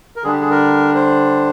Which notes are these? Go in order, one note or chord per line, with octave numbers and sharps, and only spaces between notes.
A#4
D3 G3 D4 G#4
G4
G#4
A#4
C5